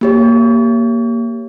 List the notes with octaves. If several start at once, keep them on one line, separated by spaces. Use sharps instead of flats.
A#3 G4 C#5